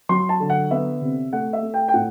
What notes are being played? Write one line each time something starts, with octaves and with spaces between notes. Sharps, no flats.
F#3 C6
A5
D3
F#5
B3 E5
C3
A3 F#5
E5
A3
G5
G5
A2 F#5